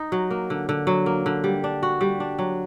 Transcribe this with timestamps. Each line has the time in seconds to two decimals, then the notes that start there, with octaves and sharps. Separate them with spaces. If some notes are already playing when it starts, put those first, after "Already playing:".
Already playing: D#4
0.12 F#3
0.31 A#3
0.50 D3
0.69 D3
0.87 F#3
1.06 A#3
1.26 D3
1.44 G3
1.64 D4
1.83 F#4
2.01 G3
2.20 D4
2.39 F#3